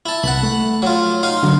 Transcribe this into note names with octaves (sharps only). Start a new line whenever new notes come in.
E4 A5
C2 F#5 A5 B5
A3
F#3 F4
D#4 F5 C6
D3 F#3 D4